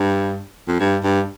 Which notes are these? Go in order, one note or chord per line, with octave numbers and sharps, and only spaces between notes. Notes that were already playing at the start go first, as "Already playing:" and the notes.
Already playing: G2
F2
G2
G2